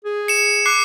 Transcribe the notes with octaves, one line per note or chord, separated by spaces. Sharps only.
G#4
C#7 E7
D6 F#6 C7